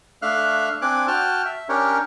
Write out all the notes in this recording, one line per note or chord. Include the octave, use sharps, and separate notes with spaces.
A3 D4 E5 F5 F6 F#6
C4 D4 G#5 D6 F#6
F#4 G5 A5 F6
E5
C#4 D4 G4 A#4 C#5